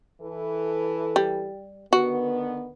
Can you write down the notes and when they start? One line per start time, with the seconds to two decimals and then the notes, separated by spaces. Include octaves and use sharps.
0.22 E3 A4
1.16 G3
1.93 D3 D#3 B3 F#4